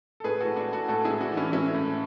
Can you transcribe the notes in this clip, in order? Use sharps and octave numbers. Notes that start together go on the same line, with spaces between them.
A4
A2 G#4 B4
F#4 A4
A2
D4 F#4
A2
F#4 A4
A2 F#4 A4
E4 G#4
A2
D4 F#4
E3
C#4 E4
A2 C#4 E4
A2